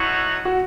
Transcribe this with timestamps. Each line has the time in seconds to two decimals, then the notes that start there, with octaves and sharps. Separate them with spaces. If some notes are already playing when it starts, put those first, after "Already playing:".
Already playing: A3 D#4 E4 F#4 C#5 F#5
0.45 F#4